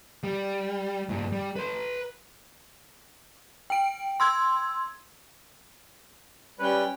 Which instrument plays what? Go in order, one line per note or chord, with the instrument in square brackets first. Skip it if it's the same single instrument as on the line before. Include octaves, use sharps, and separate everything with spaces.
[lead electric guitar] G3
G2 A#2
G3
B4 C6
[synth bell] G5 D7
C6 E6 G#6
[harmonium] G3 [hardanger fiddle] C#4 G5 [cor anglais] B4